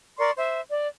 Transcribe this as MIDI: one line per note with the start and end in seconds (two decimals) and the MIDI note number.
0.19 0.31 70
0.19 0.31 74
0.19 0.31 84
0.19 0.31 85
0.36 0.60 72
0.36 0.60 76
0.70 0.87 74